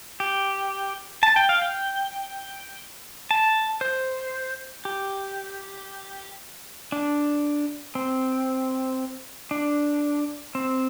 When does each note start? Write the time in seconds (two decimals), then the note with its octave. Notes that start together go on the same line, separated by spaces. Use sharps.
0.20 G4
1.23 A5
1.36 G5
1.49 F5
1.62 G5
3.31 A5
3.81 C5
4.85 G4
6.92 D4
7.95 C4
9.51 D4
10.55 C4